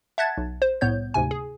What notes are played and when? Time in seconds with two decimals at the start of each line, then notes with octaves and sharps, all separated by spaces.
0.18 E5 F#5 A5 F#6 G#6 A6
0.38 B1
0.62 C5
0.81 C2 A2 B3 C#5 G6
1.14 D2 G#2 C3 G#5
1.31 G#4